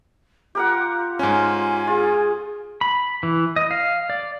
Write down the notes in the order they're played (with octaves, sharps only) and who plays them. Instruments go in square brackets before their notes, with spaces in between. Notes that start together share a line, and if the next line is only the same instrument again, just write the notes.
[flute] F4 [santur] G4 A#4 F#5
[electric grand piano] G#2 C#4 [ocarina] G#5
[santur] F4 [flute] G#4
[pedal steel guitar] B5
E3
D#5
F5
D5